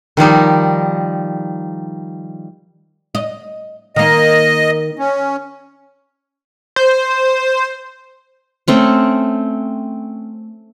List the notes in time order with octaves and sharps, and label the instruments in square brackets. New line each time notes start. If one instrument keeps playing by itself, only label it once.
[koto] D#3 F3 G3 D#4
[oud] D#5
[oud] D#3 A#3 [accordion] D#5
[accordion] C#4
[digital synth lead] C5
[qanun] A3 C4 C#4